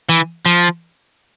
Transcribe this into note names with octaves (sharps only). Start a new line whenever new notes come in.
E3
F3